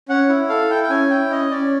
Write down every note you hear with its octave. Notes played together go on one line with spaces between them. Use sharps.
C#4 F#5
E4
A4 F5
E4 G5
G5
C#4 G#5
E4 G5
C#4 D#5
C#4 D5